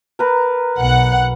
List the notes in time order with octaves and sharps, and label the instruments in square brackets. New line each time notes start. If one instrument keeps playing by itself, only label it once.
[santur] A#4 B4 A#5
[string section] B1 F#5